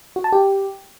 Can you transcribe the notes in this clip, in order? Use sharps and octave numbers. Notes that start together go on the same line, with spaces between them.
F#4
A5
G4